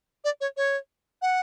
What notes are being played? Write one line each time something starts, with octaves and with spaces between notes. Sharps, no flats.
D5
C#5
C#5
F#5